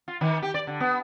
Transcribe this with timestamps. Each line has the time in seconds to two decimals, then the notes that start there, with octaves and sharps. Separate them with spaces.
0.08 F4
0.21 D#3
0.42 G4
0.54 D5
0.67 D3
0.80 B3